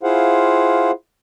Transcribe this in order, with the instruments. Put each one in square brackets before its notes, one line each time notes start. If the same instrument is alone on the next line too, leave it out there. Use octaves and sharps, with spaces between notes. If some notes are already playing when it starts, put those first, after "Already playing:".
[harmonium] E4 F4 G#4 C5 F5 F#5